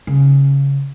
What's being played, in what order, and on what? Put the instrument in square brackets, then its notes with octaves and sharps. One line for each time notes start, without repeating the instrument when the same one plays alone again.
[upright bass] C#3